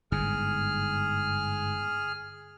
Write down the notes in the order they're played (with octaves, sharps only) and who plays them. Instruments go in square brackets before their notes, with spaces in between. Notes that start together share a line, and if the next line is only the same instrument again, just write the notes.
[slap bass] G1 G#2 [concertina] G#4 F6